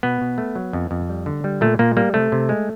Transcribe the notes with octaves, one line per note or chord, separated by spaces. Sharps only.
B2 B3
B2
A3
F#3
F2
F2
G3
D3
G3
A#2 A3
A#2 A#3
G3 A#3
C3 A3
C3
G#3